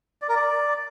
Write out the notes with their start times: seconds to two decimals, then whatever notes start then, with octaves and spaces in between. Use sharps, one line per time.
0.22 D5
0.29 A#4
0.35 D5